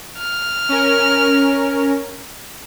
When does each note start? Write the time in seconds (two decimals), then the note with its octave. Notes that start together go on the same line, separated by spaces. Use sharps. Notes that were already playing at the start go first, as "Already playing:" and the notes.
0.18 F6
0.69 C#4 A#4